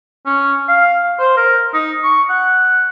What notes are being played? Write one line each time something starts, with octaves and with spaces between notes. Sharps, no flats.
C#4
F5
C5
A#4
D#4
C#6
F#5